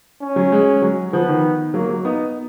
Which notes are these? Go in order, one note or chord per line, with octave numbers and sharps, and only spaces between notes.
C#4
F#3
G#3
F#3
F3 B3
D#3
F#3 A#3
F#3
B3 D#4